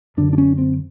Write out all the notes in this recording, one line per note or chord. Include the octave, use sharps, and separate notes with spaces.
F#2 D3 D4
D4
C#4
C4